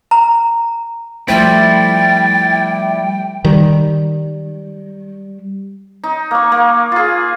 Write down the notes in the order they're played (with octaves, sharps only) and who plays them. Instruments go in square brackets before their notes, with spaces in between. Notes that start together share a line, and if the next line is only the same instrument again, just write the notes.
[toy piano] A#5
[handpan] F3 A3 C5 [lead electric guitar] G3 E4 [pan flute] G5 [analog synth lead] A6
[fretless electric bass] D#3 [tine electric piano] G3
[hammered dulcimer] D#4
A#3 C#6
A#3
F4 G#4